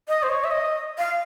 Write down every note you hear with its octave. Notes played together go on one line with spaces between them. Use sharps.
D#5
C5
C#5
E5
D#5
F5